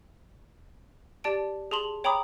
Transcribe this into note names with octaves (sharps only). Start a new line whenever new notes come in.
G4 D5 A5 D7
G#4 A5 C6 F#7
C#5 G5 A#5 B5 D6 D#6